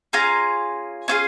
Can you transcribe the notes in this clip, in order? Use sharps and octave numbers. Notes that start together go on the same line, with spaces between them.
C#4 F4 G#4 A#5
C#4 F4 G#4